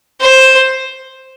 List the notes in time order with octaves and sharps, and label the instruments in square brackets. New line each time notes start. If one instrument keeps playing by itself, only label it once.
[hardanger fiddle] C5